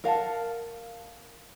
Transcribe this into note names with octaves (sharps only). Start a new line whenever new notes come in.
A#4 F5 F#5 A5